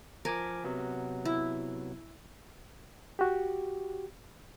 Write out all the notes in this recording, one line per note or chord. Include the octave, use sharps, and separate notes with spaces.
F3 A#4 G#5 D6
C3 F#3 B3
E4
F#4 G4